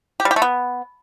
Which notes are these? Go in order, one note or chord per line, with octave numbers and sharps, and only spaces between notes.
G4
G3
G4
A3
B3